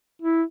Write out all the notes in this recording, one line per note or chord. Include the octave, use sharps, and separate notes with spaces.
E4